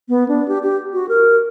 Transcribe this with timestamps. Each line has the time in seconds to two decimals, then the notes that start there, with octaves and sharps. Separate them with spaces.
0.09 B3
0.28 D4
0.48 G4
0.63 G4
0.93 F#4
1.09 A#4